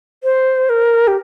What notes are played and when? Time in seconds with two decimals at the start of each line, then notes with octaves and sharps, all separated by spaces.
0.24 C5
0.69 A#4
1.07 G4